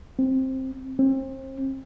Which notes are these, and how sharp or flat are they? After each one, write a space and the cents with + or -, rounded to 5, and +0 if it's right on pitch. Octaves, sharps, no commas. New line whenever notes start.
C4 +10
C4 +35